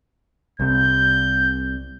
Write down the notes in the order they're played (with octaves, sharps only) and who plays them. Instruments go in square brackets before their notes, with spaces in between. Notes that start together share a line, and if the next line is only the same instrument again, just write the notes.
[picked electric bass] C2 C3 [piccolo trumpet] G6